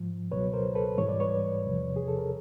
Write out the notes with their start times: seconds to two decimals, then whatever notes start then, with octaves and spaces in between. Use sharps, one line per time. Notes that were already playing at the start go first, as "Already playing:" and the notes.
Already playing: G#2 F3
0.32 C#2 B2 F#3 B4 C#5
0.53 A#4 C5
0.75 A4 B4
0.98 G#2 E3 G3 C#5
1.09 D5
1.20 B4 C#5
1.64 E2 C3 F3
1.96 G#4
2.08 A4
2.18 A#4